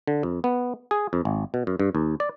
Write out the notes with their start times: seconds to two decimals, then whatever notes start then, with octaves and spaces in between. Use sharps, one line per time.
0.07 D3
0.23 F2
0.44 B3
0.91 G#4
1.13 F2
1.25 G#1
1.54 B2
1.67 F#2
1.80 G2
1.95 D#2
2.20 D5